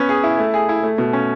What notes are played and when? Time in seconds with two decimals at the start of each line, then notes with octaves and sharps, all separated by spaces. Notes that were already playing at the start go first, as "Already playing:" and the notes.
Already playing: B3 C#4
0.09 G#4
0.23 E4
0.38 A3
0.54 G#4
0.69 E4
0.83 A3
0.98 B2
1.13 C#4